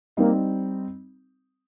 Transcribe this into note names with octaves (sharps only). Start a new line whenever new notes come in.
G3 A#3 C4 D#4